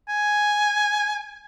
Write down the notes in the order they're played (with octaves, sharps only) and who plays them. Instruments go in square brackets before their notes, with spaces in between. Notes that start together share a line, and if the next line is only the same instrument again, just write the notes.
[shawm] G#5